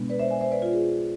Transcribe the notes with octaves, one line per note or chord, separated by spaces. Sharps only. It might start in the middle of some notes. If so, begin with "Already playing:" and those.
Already playing: B2 G#3 B3 D4
B4 D5
C5 E5
E5 G#5
C5 E5
B4 D5
F4
G#4